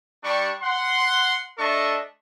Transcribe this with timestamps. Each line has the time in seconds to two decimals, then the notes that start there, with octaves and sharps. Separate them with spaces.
0.23 G3 D4 C#6
0.62 F#5 C6
1.58 A3 D4 A4 D#5 E5 C#6